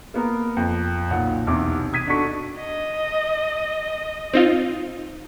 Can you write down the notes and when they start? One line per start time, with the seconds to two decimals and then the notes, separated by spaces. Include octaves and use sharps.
0.14 A#3 B3 A#4
0.57 F2
1.10 B1 A#2 F#5
1.47 B1 E2 C3 D6
1.93 D#6 G#6 B6 D#7
2.07 D4 D#4 F#4 A4 C#6 B6
2.58 D#5
4.33 C4 D#4 F4